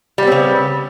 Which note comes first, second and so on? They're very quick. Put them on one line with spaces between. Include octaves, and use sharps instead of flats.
G3 B3 C4 C#3